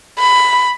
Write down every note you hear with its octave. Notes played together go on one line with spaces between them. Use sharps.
B5